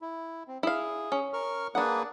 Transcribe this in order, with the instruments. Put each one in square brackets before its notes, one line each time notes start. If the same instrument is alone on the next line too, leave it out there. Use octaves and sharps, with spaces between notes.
[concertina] E4
C4
[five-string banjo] E4 F5 [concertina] G#4
[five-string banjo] C#4
[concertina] A#4 C#6 F6
[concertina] A#3 G#4 B4 [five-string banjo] D4 F#5